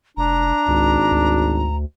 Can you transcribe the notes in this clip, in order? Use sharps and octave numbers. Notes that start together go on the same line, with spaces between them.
F1 D4 A#5
G#1 C#2
D2